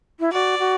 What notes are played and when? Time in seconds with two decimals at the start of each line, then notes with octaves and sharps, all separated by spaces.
0.20 E4
0.32 F#4 D5
0.59 F#4